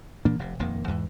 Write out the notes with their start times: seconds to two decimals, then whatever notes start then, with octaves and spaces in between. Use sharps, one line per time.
0.25 A#2 E3 A#3 D4
0.39 F1 C3
0.59 D#1 F2 D#3 A#3
0.88 E2 G#2 E3